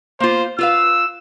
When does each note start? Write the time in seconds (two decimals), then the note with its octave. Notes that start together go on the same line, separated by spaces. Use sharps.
0.20 A#3 F4 C5
0.59 F4 B4 F5 E6